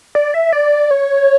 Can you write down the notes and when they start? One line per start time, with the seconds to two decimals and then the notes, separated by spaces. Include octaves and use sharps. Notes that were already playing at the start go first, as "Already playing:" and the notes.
0.15 D5
0.34 E5
0.53 D5
0.91 C#5